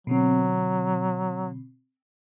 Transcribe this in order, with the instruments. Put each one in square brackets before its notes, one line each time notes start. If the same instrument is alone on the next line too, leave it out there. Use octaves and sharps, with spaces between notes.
[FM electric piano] B2 D3 C4 [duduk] F#3